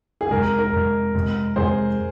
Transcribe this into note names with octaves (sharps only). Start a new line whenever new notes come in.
G#4
F2 C3 G#3 A#4
A#4
F2 C3 G#3
F2 C3 G#3
F2 C3 G#3 G#4 C5